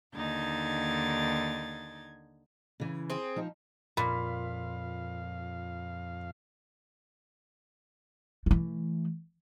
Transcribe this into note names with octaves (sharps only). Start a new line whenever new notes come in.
D#2 D3 D#4 G#6 A6
C#3 E3
C4 G#4
F3 D#4
F2 A#2 F5 B5
E3 A3